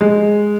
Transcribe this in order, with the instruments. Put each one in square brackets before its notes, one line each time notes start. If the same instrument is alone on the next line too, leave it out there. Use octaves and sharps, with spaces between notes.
[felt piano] G#3